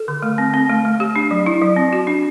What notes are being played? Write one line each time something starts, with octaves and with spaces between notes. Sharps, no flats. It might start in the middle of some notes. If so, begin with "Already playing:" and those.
Already playing: A4
D3
A3
C4
C4
A3
A3
G4
D4
F#3
E4
F#3
C4
F#4
D4